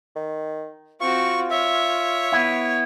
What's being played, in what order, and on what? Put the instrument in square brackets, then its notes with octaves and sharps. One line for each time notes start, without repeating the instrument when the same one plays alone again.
[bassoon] D#3
[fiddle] C4 F#4 [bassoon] F4 [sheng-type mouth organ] C#6
[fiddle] C#5 [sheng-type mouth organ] E5
[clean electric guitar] B3 E4